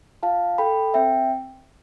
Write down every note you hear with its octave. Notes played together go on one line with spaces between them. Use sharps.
F4 F5 A5
A4 G5 B5
C4 E5 G5